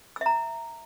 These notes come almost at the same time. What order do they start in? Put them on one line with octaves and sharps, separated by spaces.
E6 E5 A#5